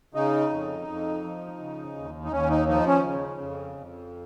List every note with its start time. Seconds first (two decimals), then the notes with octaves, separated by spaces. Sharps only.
0.14 C#3 D#4
0.51 F2
0.88 F2
1.24 F3
1.59 C#3
1.96 D#2
2.25 D#4
2.32 D#2 C#4
2.50 D#4
2.68 F3 D#4
2.87 C#4
3.05 C#3
3.41 F2
3.77 F2